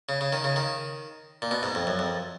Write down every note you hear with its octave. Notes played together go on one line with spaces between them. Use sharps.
C#3
C#3
D#3
C#3
D#3
A#2
B2
G#2
F2
F#2
F2